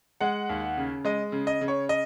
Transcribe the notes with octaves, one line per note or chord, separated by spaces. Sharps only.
G#3 F#5
D#2
C#3
G#3 D#5
C#3
D#5
C#3
C#5
D#5